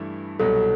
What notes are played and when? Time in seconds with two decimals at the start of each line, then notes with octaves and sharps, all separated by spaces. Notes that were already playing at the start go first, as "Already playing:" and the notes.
Already playing: G2 E3 A3 E4
0.39 C2 B2 F#3 A4